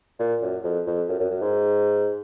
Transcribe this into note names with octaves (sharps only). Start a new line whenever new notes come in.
A#2
F#2
F2
F2
F#2
F#2
F#2
G#2